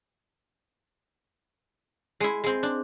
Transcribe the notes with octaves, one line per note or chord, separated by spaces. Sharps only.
G#3 E4
G#3 C4
D4